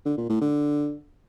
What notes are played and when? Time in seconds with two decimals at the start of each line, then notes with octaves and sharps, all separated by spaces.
0.05 D3
0.17 A#2
0.29 A2
0.41 D3